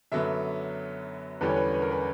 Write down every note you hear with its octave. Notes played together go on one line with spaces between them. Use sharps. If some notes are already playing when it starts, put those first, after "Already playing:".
F#2 D3 F#3 B3 E5
E2 D3 G3 C#4 B4
C#5
B4
B4
A#4
B4